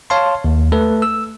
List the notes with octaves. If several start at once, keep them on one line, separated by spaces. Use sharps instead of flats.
C#5 F5 A5 C6
D#2
A3 A4 B4
E6